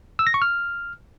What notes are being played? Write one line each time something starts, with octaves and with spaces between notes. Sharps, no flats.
E6
A#6
C#6
F6